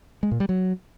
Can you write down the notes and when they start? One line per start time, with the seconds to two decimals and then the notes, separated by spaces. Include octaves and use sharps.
0.23 G#3
0.32 A#2
0.40 G3
0.49 F#3